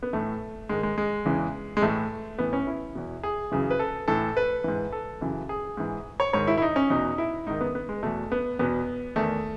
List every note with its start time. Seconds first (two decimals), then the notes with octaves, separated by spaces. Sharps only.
0.03 B3
0.13 A2 E3 A3
0.69 G#2 D#3 G#3
0.83 G#3
0.98 G#3
1.25 E2 C#3 E3
1.77 G#3
1.82 A2 E3 A3
2.38 A2 E3 B3
2.53 C#4
2.67 E4
2.95 E2 B2
3.23 G#4
3.52 F#2 C#3 E3
3.71 B4
3.80 A4
4.08 A2 E3 A4
4.37 B4
4.64 G#2 E3
4.92 A4
5.21 F#2 C#3 E3
5.49 G#4
5.77 G#2 E3
6.20 C#5
6.33 G#2 D#3 C#5
6.47 E4
6.58 E4
6.62 D#4
6.76 C#4
6.90 E2 B2 D#4
7.18 E4
7.47 G#2 D#3 D#4
7.61 B3
7.75 B3
7.89 G#3
8.03 E2 B2 A3
8.32 B3
8.59 E2 B2 B3
9.16 E2 D#3 A3